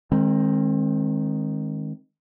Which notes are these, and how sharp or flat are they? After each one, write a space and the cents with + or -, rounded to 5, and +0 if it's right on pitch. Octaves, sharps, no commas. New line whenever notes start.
D#3 +0 G#3 +0 C4 +35